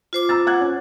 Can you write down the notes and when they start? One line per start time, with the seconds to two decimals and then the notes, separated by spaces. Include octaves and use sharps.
0.13 F4 C5 D6
0.29 A#5 E6 A6
0.47 F#5 F#6 G#6
0.61 C#4